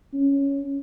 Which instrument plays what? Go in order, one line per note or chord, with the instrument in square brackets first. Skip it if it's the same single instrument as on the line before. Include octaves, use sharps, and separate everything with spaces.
[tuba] C#4